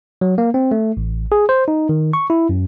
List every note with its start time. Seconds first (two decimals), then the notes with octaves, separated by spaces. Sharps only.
0.21 F#3
0.38 A#3
0.54 C4
0.71 A3
0.97 A1
1.32 G#4
1.49 C5
1.68 D#4
1.89 D#3
2.13 C#6
2.30 E4
2.49 F#2